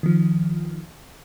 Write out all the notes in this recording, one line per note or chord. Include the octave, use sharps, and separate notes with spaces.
D#3 F3